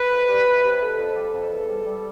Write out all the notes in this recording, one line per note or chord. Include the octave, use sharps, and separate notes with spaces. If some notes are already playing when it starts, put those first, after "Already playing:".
Already playing: B4
F2
G3
C3
C3
F2 A4
F2
G3
F2
E2
G3
G3